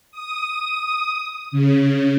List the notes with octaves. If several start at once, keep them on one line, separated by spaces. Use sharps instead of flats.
D#6
C#3